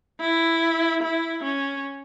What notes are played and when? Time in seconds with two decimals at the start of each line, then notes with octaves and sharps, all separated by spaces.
0.20 E4
1.03 E4
1.43 C#4